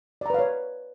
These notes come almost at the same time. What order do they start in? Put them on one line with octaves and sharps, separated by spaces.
D5 A#5 B4 F5 C#5